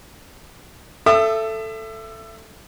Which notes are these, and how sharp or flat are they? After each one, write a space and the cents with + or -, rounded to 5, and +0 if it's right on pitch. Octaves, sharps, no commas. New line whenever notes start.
A4 +5 E5 +25 D#6 -40